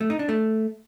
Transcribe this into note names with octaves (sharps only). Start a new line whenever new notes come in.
A3
D#4
D4
A3